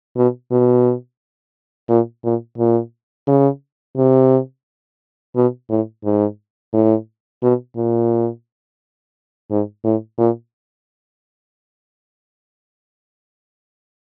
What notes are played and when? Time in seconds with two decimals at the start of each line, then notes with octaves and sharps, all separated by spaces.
0.17 B2
0.52 B2
1.89 A#2
2.24 A#2
2.58 A#2
3.27 C#3
3.97 C3
5.36 B2
5.70 A2
6.04 G#2
6.73 A2
7.43 B2
7.77 A#2
9.51 G#2
9.84 A2
10.19 A#2